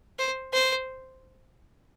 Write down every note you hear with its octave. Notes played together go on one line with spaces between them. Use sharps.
C5
C5